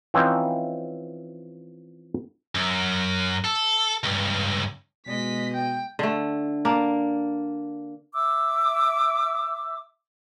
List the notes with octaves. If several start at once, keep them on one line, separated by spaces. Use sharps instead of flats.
E3 F3 C4 C#4 D#4 E4
F#2
A4
C#2 G2
B2 G#3 D#5 B6
G5
D3 A3
A#3 D4
E5 D6 E6